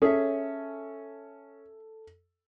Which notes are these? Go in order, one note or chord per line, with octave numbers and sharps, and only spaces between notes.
C#4 G#4 A4 C#5 E5